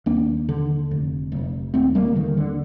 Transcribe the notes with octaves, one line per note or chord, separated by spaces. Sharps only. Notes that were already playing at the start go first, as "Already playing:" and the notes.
D#2 A#3 D4
D3
F1
F1
D#2 A3 C4
G3 A#3
D3 D#3
D3